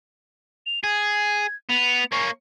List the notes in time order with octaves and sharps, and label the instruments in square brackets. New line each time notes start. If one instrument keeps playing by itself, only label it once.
[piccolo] F7
[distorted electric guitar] G#4 [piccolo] G#6
[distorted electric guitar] B3 [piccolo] F7
[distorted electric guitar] A#3 C#4 [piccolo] C#6